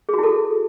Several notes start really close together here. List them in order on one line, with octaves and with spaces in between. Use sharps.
G#4 F#4 E4 A4